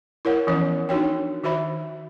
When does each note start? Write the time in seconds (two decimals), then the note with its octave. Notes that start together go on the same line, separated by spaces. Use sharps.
0.25 E4 A#4 C#5 F#5
0.47 E3 F3 B3 C#4 C#5
0.89 D4 D#4 F#4 C#5 G5
1.44 D#3 F#4 C5 E5 B5